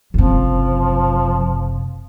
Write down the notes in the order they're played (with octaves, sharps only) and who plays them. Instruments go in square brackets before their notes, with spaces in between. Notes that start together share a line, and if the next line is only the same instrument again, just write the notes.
[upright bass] F#1 C3 [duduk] F3